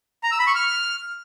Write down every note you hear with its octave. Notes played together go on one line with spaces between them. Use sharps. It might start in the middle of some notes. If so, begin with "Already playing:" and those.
A#5
E6
B5
C#6
F6